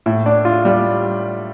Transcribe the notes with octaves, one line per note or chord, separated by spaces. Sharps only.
A2
D4
F4
G3